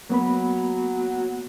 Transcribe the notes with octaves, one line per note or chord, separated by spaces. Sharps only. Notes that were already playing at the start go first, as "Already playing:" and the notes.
F#3 A#3 B3 B5